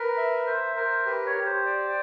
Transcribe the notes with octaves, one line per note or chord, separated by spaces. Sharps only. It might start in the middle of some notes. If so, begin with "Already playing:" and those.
Already playing: A#4 B4
E5
C5 E5
A#4 C5
G4 B4
C#5
G4
C5
D5